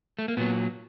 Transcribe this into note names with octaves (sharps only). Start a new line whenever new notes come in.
A3
A#3
A#2 F#3 B3